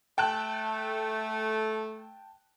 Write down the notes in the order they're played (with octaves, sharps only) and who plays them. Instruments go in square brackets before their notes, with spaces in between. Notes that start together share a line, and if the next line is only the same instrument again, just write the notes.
[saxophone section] A3 [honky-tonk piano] G5 A5 F#6